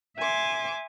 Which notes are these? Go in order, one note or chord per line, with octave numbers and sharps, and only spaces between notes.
E5 G#5 C6 D6